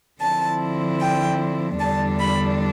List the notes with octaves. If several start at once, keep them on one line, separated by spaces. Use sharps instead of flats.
D3 F3 C4 E4 A5
G5
E2 D3 G3 D4 A5
B5